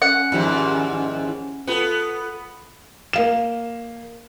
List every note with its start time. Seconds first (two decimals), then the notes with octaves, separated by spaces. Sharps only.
0.02 C#4 F#5
0.32 D#2 G#2 F3 G3 E4
1.67 B3 F4 A4 B4
3.13 A#3 F5 E7